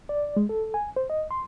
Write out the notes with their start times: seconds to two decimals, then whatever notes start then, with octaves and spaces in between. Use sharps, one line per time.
0.09 D5
0.37 G#3
0.49 A4
0.74 G#5
0.96 C5
1.10 D#5
1.31 C6